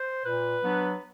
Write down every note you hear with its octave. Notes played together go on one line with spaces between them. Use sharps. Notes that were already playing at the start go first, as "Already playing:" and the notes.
Already playing: C5
A#2 B4
F#3 B3 D4